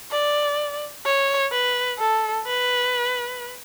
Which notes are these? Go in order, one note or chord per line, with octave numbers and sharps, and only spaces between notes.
D5
C#5
B4
A4
B4